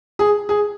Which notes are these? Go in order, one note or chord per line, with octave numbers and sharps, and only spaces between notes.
G#4
G#4